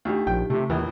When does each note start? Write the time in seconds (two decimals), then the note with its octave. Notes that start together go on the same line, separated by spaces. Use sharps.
0.05 D2 D#4 F4 G4
0.27 A#1 G5
0.50 C3 A3
0.70 A#1 D#2 E3